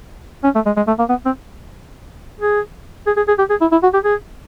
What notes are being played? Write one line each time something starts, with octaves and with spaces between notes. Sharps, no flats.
C#4
A3
G#3
G#3
A3
A#3
B3
C4
G#4
G#4
G#4
G#4
G4
G#4
E4
E4
F#4
G4
G#4